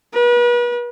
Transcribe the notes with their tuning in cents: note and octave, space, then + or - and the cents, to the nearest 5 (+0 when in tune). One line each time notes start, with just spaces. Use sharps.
B4 -40